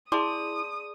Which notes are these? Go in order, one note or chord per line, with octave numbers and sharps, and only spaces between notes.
E4 G#4 D5 A5 C6 D6 D#6